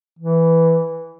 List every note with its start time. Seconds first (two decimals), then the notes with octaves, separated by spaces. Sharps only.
0.19 E3